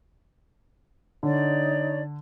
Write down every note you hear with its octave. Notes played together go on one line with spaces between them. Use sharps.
D3 D#4 C#5 D5